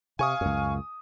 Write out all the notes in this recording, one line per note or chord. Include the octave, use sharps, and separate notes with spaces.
C3 F5 G#5 C#6 D#6
C#2 F#2